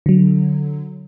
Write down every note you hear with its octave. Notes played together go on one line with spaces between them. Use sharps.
D3 F#3